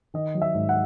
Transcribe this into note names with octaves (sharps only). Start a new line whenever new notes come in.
D#3 D#5
F#3
E5
G#2
F#5